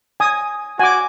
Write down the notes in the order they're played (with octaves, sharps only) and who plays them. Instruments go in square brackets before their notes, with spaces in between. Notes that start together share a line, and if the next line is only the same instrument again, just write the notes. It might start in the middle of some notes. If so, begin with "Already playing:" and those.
[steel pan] G#5 D#6
[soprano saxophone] F#4 [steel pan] G#5 D6